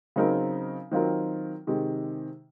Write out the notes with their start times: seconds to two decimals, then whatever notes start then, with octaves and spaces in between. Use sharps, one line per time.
0.16 C#3 F#3 C4 D#4 A#4
0.91 D#3 F#3 C4 F4 A#4
1.67 C3 D#3 G#3